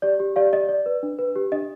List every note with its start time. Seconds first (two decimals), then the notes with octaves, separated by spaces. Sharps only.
0.02 G4 D5
0.20 G4
0.36 G4 D5 F5
0.53 D5 D#5
0.69 D5
0.86 B4
1.03 D4
1.19 B4
1.36 G4
1.52 D4 D#5